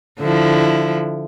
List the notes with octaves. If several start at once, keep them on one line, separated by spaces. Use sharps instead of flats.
D3 F3 E4